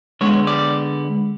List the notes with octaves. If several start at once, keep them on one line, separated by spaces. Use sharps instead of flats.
D3 G#3 B3 C#5
D5